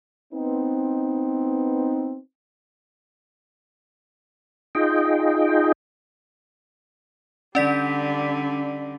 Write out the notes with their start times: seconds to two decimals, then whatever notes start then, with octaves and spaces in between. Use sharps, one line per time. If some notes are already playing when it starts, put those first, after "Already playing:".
0.34 B3 C4 D#4
4.75 D#4 F4 G#4 D#5 G5
7.55 D3 G3 C#4 D5 B6